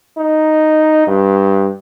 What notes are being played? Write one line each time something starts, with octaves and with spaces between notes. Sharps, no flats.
D#4
G2